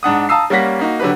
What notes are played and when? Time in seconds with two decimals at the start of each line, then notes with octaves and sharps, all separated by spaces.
0.03 G#2 D4 F#5 D#6
0.29 F5 A5 A#5 D#6 E6 C7
0.50 G3 A#3 C#4 F#5 A#6 B6
0.79 A#3 D#4 F#4
1.00 D3 F#3 G4 B4